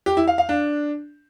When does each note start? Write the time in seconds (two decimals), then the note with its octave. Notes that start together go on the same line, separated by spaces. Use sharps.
0.06 G4
0.17 E4
0.28 F5
0.38 F5
0.49 D4